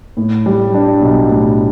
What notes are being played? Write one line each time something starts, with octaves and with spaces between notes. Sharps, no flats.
A2
G3
D4
B1
A2